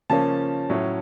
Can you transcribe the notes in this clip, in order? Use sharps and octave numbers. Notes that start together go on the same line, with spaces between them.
C#3 F3 A#3 C#4 A5
A2 F#3 A3 C#4